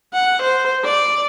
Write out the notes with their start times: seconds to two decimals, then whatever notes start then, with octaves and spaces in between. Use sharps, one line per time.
0.14 F#5
0.43 C5
0.85 D5